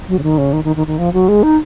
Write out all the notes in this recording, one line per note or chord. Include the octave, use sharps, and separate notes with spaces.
F#3
C#3
D#3
C#3
D#3
D#3
D#3
D#3
F3
F#3
G#3
D#4